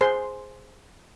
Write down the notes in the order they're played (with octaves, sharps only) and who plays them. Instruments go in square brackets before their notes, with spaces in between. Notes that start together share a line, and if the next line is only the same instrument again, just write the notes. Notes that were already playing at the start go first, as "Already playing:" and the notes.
[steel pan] G#4 C5 C6